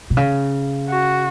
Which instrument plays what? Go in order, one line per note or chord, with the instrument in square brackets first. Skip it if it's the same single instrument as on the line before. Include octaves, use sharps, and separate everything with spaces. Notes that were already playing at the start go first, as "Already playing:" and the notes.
[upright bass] B2
C#3
[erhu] F#4